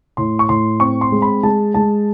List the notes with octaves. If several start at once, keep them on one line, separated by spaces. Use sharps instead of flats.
A2 C6
C#6
A2 C6
C4 C#6
C6
G#3
B5
G#3 A5
G#3 A5